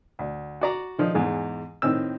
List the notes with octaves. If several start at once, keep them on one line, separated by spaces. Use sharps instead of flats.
D2
F#4 D5 A#5
D#3 F3 D4 D#4
E2 G#2 G#3
A2 D#3 C4 E6